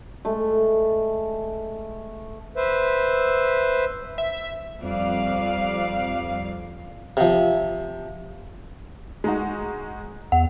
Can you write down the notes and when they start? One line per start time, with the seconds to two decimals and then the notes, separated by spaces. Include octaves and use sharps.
0.25 G#3 A3
2.57 B4 C5 E5
4.18 E5
4.83 F2 G3 D5 F5
7.17 C3 F3
9.24 G#3 D#4 F#4
10.32 E2 F#5